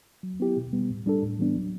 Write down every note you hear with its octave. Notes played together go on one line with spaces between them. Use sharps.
F#3
B3 E4 G4
B2
G3 B3
A2
G3 D4 A4
A2
E3 G3 B3 D4
F#3